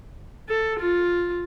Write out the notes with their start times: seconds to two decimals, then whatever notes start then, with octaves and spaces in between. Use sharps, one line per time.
0.49 A4
0.79 F4